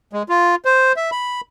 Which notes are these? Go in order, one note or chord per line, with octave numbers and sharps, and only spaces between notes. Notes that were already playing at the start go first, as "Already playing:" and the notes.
G#3
F4
C5
E5
B5